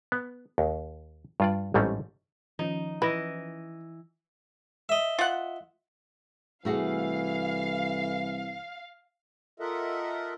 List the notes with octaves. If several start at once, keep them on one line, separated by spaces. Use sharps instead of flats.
B3
D#2
G2 F4 D5
A1 G#2 G3 A3 C4 C#4
D#3 F3 C#4 D#4
E3 B4 D#5
D#5 E5
F4 F#5
C2 E3 A3 F#4 G#4 F5
F4 A4 A#4 D#5 E5 F#5